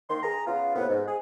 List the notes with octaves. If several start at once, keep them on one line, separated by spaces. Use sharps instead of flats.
D#3 A#3 C6
G#4 A#5
C#3 B3 F4
D#2 A2 C3 B3
G#2
G#4